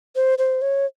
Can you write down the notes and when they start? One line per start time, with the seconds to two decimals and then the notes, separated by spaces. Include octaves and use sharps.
0.16 C5
0.38 C5
0.62 C#5